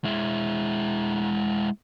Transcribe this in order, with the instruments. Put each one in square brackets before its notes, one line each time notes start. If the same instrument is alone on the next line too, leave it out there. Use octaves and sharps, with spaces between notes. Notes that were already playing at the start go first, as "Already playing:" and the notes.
[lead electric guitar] G#3 E4